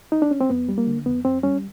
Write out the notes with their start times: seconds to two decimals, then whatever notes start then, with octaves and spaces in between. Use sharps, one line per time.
0.12 D#4
0.22 D4
0.31 C#4
0.41 C4
0.50 F2 B3
0.69 G3
0.78 A#3
0.87 D3
1.06 F2 B3
1.25 F2 C4
1.43 G3 C#4